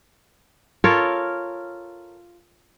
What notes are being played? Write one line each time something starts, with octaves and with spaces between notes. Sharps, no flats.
F4 A4 A#4 C#5